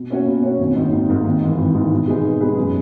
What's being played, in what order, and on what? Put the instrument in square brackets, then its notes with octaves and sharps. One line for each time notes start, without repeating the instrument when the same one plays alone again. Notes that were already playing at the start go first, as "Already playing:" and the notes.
Already playing: [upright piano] B2
A#3 C#4 F#4 C#5
B2
A#3 C#4 F#4 C#5
G#1
G#2 D#3 A#3 D#4
G#1
G#2 D#3 A#3 D#4
G#1
G#2 E3
G#1
G#2 E3
B2
G#3 D#4 G#4 B4
B2
G#3 D#4 G#4 B4
F#2